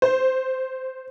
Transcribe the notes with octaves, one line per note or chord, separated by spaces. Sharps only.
C5